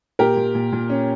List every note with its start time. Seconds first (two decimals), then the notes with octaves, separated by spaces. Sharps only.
0.19 A#2 G4 A#4
0.37 A#2
0.55 A#2
0.72 A#2
0.90 C#4